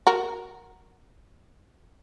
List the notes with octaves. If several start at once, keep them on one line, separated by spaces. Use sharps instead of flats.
F#4 A#4